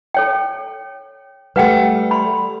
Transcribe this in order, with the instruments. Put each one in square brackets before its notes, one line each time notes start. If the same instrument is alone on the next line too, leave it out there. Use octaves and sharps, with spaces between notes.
[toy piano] A4 C#5 G5
[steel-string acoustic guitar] G3 A3 [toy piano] B4 F#5 G5
[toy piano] B5 C6